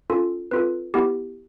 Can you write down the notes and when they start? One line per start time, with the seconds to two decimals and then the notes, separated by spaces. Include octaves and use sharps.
0.10 C#4 F4 A4
0.51 C4 F4 A4 B4
0.94 B3 E4 G4